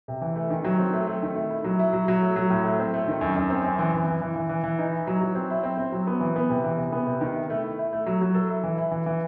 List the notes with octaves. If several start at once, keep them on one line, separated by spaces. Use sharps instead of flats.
C3
E3
A3
D#3
F#3
C4
A3
A3
D#3
A3
E4
F#3
E4
F#3
F#3
A3
F#3
A2
A3
C4
A3
D#3
F#2
F#2
C4
F#2
E3
E3
E3
E3
E3
E3
E3
D#4
E4
F#3
F#3
C4
E4
C4
C4
F#3
B3
E3
B3
C3
E3
C3
B3
C3
D#3
E4
A3
E4
E4
A3
F#3
F#3
A4
E4
E3
E4
E3
E3